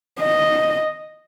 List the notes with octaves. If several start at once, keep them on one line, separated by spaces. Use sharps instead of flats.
D#5